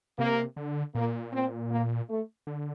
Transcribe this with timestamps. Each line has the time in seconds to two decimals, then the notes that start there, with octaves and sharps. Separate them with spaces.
0.19 C3 A#3
0.57 D3
0.95 A#2 A#3
1.33 C4
1.71 A#3
2.09 A3
2.47 D3